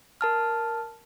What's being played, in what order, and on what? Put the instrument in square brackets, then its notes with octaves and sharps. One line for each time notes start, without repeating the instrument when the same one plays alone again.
[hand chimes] A#4 A5 F6